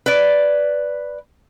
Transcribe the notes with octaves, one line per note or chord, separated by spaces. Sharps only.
B4 D5